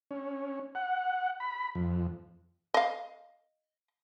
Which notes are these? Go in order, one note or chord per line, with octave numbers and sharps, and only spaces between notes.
C#4
F#5
B5
F2
D#5 F5